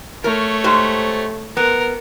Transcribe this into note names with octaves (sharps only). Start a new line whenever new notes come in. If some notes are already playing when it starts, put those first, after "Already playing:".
A3 A#4 C#5
G#2 G4 C5
B3 A#4